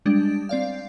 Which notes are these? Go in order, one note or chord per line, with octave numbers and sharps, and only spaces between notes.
G3 G#3 D4
C4 D5 F5